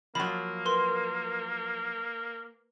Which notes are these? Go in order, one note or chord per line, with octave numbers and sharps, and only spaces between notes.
F3 F#3 A#3 B5
A#4 B4 C6